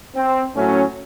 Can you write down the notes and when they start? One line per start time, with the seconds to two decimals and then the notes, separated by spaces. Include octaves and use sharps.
0.15 C4
0.55 A2 F#3 A3 C#4